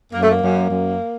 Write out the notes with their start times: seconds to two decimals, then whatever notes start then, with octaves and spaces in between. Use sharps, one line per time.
0.13 F#2 A#3
0.22 A3
0.31 A#3
0.42 F#2
0.71 F#2